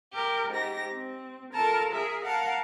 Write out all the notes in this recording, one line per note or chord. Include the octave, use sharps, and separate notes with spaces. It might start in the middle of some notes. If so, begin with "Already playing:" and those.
G4 A#4
G#2 G4 A#6
C4
F4 A4 A#4 A5 A#5
G#4 A#4 E5
A#4 F5 F#5 A5